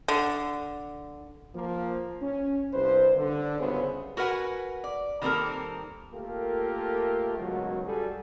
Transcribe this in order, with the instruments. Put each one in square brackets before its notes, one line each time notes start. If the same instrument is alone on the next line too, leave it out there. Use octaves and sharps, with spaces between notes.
[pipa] D3
[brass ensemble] F3 A#3
C#4
C2 G2 B4 C5
D3
G1 C2 F#2 C#3 B3 C5
[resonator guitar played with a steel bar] F#4 A#4 B4 F#5 G#5
D5
D#3 G3 A#3 C4 A4 A#4
[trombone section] A3 A#3 F4 G4 A4 A#4
C#2 G#2 B2 D#3 F#3
G3 F#4 G#4 A4